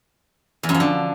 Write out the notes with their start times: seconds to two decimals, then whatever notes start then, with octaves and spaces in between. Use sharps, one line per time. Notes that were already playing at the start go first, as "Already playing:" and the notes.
0.63 E2
0.69 F#2
0.74 F3
0.80 D3